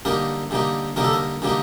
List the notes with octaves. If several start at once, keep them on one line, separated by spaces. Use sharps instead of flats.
D3 G3 A#3 D#4 A#4
D3 G3 A#3 D#4
D3 G3 A#3 D#4 A#4
A4
A#4
D3 G3 A#3 D#4